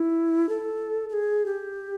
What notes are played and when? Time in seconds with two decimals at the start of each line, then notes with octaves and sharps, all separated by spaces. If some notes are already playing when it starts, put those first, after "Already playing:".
Already playing: E4
0.49 A4
1.09 A4
1.13 G#4
1.46 G4